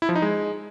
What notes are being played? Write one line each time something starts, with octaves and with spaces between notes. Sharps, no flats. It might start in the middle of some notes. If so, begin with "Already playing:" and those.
E4
F3
D#4
G#3